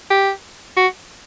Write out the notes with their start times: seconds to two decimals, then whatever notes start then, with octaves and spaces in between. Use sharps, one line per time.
0.11 G4
0.77 F#4